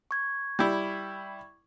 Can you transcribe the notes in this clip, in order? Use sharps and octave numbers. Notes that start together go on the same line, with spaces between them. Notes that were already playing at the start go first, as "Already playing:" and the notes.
C#6 G#6
G3 E4